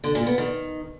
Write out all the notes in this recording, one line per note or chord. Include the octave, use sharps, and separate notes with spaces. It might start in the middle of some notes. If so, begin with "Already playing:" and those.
D3
A#2
B3
D#3